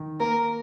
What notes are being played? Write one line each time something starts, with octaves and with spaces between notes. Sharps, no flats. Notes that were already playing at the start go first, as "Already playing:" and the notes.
Already playing: D#3
A#3 A#4